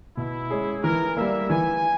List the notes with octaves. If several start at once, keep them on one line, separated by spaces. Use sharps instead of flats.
B2 E4
G#3 C#4 G#4
E3 A#4
G3 A#3 E5
E3 G#5